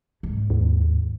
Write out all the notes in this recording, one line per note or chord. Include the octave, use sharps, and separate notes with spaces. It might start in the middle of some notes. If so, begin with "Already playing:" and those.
G#2
D#2